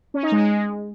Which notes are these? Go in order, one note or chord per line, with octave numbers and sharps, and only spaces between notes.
C#4
D#4
G#3